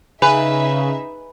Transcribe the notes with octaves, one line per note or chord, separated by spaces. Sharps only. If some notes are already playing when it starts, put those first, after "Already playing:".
C#3 D#4 G#4 B4 E5 G#5